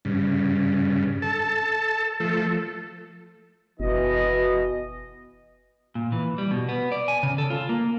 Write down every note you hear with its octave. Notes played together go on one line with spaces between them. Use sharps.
G2 C#3
A4 A5
F3 A3 A4
F#1 B2 E3 D#5
A#2
E3
G3
B2
B3
D5
G#5
C#3
A4
F4
A#3